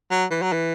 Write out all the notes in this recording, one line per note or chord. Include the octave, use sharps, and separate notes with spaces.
F#3
E3
F#3
E3